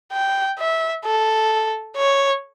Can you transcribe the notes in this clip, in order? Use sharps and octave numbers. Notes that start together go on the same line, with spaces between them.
G5
E5
A4
C#5